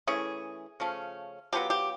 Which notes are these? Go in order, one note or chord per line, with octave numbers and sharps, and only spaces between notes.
E3 A3 C#4 G#4
C#3 F3 A3 C#4
F#3 B3 D4 F4 G4
G4